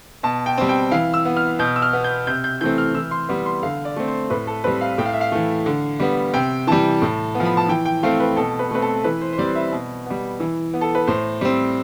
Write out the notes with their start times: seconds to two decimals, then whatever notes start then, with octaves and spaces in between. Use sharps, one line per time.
0.23 B2 A5
0.46 G5
0.58 G3 C4
0.69 G5
0.92 E3 F5
1.14 E6
1.25 B3
1.37 F6
1.59 B2 G6
1.76 E6
1.82 F6
1.93 B3
2.04 G6
2.27 C3 G6
2.44 G6
2.61 E3 A3 C4 G6
2.78 F6
2.95 E3 E6
3.11 C6
3.29 G3 B3
3.46 C6
3.63 D3 F5
3.85 D5
3.96 A3 C4
4.08 C5
4.30 A2 B4
4.47 A4
4.64 G3 C4 B4
4.81 F5
4.98 A2 G5
5.06 F5
5.13 E5
5.21 F5
5.32 E3 A3
5.66 D3
6.00 G3 B3
6.34 C3 G5
6.67 E3 G3 A5
7.02 A2
7.35 B3
7.40 F3
7.45 B5
7.57 A5
7.68 E3 G5
7.85 G5
8.03 A3 C4 F5
8.20 B4
8.36 B2 A4
8.59 B4
8.71 A3 C4 B4
8.82 A4
9.04 E3 B4
9.21 C5
9.33 C5
9.38 G3 C4 D5
9.55 E5
9.72 B2
10.06 G3 B3
10.40 E3
10.74 B3
10.81 A4
10.95 B4
11.07 A2 C5
11.41 G3 C4